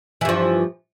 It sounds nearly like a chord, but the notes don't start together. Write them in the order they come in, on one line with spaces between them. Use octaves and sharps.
E3 G2 F3